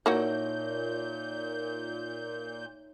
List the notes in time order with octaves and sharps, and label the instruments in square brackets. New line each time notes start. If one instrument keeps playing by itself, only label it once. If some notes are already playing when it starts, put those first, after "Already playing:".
[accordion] A#2 G6 [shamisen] A#3 E4 F#4 [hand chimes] D#4 C#5 E5